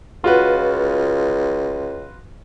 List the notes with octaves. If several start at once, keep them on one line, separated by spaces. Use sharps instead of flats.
C#2 F4 F#4 B4